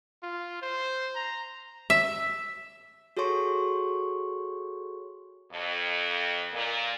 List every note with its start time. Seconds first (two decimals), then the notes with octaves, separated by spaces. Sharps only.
0.23 F4
0.62 C5
1.15 A#5
1.90 E5
3.17 F#4 G#4 A4 C#5 C6 C#6
5.52 F2
6.53 A#2